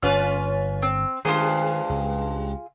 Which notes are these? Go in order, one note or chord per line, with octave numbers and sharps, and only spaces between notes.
G1 C#4 F4 B4 F6
C4
G2 D#3 G#3 F4 G4 G#4 C5
C#2